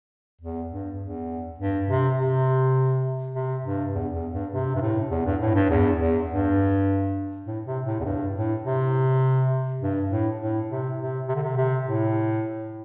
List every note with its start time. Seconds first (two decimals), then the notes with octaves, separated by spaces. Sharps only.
0.41 E2
0.70 G2
1.00 E2
1.59 G2
1.88 C3
2.17 C3
3.35 C3
3.64 G2
3.94 E2
4.14 E2
4.33 G2
4.52 C3
4.76 G2
4.81 A2
5.11 E2
5.26 G2
5.41 A2
5.55 G2
5.70 E2
5.99 E2
6.29 G2
7.46 A2
7.66 C3
7.85 A2
8.00 E2
8.05 G2
8.34 A2
8.64 C3
9.81 G2
10.10 A2
10.39 A2
10.69 C3
10.99 C3
11.29 C3
11.35 D3
11.43 C3
11.57 C3
11.86 A2